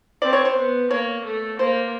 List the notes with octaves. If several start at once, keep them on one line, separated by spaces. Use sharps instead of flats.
C4 D5
C#5
C5
B3
A#3 C#5
A3
A#3 C5